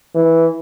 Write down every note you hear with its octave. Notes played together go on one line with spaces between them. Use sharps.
E3